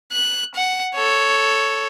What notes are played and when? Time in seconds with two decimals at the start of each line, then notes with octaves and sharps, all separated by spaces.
0.12 F#6
0.55 F#5
0.94 A4 C#5